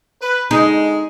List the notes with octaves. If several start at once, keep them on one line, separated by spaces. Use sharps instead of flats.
B4
D3 G#3 D#4